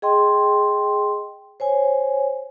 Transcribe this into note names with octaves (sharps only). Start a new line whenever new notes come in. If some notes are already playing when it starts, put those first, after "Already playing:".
G#4 D#5 G5 C6
C5 C#5 G#5